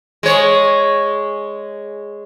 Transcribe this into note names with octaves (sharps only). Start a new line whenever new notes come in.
G#3 C#5